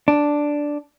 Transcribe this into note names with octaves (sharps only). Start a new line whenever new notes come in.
D4